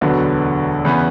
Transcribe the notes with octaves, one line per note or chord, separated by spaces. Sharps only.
E1 D2 D3 F#3 B3
E2 C#3 E3 B3